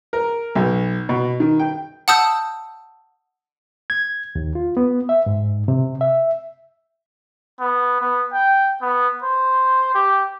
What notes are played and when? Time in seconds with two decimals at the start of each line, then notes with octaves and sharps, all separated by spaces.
0.13 A#4
0.55 B1
1.09 B2
1.40 D#3
1.59 G5
2.08 F#5 A5 D#6 E6 G6
3.90 G#6
4.36 D#2
4.55 F4
4.77 B3
5.09 E5
5.26 G#2
5.68 C3
6.01 E5
7.60 B3
8.01 B3
8.32 G5
8.82 B3
9.23 C5
9.95 G4